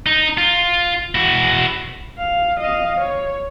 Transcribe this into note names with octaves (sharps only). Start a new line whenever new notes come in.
D#4
F4
E4 F#4
F5
D#5 F5
C#5